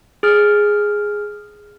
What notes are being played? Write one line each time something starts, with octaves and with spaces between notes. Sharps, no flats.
G#4 F6